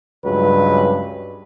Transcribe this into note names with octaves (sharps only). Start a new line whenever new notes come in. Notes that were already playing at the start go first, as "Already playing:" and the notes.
C#2 G2 F#3 B4